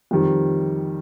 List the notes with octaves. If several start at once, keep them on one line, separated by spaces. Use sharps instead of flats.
F2 D#3 G3